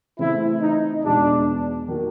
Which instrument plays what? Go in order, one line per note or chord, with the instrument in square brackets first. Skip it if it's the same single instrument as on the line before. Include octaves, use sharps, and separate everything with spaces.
[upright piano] C#3 E3 A3 C4 [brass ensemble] E4
[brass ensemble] D#4
[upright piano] E2 B2 G#3 [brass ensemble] D4
[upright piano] D#3 F#3 A#3